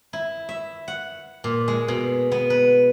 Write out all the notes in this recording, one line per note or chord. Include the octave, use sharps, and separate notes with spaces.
E4
E5
F#5
A#2
G#3
B2
B3
B4